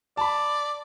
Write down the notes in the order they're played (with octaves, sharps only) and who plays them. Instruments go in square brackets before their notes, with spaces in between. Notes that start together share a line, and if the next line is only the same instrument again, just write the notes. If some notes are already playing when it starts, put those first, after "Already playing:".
[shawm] D5 [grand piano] A5 B5